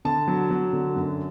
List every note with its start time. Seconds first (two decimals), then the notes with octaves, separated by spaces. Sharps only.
0.05 D3 A5
0.28 F#3
0.51 F#3
0.73 D3
0.96 F#2